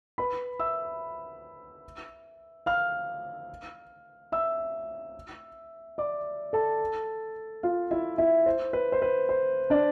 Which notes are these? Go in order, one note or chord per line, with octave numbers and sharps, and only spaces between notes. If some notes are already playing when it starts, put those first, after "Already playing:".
B4 B5
E5 E6
F5 F6
E5 E6
D5 D6
A4 A5
F4 F5
E4 E5
E4 E5
C5
B4
C5
B4
C5
D4 D5